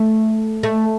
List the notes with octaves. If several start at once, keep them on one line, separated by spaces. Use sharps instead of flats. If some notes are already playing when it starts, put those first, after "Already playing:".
Already playing: A3
A3